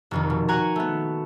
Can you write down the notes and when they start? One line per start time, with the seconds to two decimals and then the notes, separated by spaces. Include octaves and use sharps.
0.11 F1 F2 D#3
0.30 B2
0.48 F#4 F#5 G#5 A#5
0.76 A3 B3